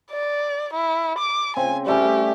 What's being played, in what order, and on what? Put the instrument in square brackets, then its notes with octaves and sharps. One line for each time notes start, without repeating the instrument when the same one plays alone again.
[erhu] D5
E4
D6
[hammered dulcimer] C#3 C4 [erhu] G#5
[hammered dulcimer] G3 A3 C#4 [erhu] G4